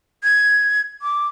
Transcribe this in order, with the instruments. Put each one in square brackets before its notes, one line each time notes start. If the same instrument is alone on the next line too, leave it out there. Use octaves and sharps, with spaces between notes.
[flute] G#6
D6